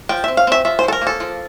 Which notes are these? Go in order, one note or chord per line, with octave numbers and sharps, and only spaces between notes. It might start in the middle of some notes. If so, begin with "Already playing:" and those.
F3 G5
C4 E5
F5
C4 E5
F3 E5
C5
F3 A4
A#4
A#3
A4
F3